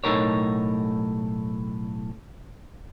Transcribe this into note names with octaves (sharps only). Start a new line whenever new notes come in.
B1 A2 A3 D#4 A#4 C#5